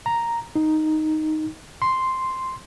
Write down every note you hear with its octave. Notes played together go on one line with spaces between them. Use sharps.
A#5
D#4
C6